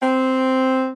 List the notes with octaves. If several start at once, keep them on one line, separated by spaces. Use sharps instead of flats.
C4